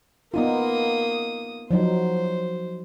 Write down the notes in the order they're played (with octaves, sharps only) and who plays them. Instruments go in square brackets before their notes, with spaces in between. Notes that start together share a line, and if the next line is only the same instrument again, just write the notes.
[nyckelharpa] A#3 D#6 [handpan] B3 D#4 F4
[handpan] F3 F#3 D#4 [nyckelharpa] C5